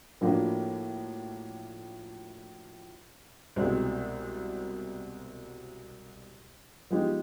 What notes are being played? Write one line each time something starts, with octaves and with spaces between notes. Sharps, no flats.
A2 F3 A#3 D4 F#4
C2 B2 G#3 C4
F3 G#3 B3 D#4 G4